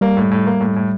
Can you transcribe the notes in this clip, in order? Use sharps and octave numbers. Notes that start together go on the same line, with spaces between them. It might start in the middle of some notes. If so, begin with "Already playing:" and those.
G3 A#3
A2
A2
A#3
A2
A2